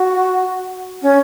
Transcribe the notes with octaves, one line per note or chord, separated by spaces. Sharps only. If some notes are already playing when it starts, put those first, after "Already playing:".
Already playing: F#4
C#4